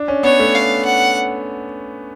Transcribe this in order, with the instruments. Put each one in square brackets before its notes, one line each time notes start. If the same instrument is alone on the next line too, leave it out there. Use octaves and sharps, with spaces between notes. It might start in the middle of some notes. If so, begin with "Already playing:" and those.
Already playing: [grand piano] D4
C#4
[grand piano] B3 [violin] C#5
[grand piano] A3
[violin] F5
F#5